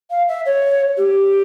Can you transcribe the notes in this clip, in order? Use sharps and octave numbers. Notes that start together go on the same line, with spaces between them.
F5
E5
C#5
G4